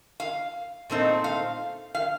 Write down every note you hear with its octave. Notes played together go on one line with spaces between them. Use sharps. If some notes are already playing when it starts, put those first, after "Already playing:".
F5
A#2 A3 C4 D#4
F5
F5